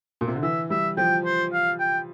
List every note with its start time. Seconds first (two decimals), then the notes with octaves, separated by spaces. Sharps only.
0.21 A#2
0.28 C3
0.35 D3
0.43 E3 E5
0.70 G3 E5
0.97 F3 G5
1.25 C5
1.53 F5
1.80 G5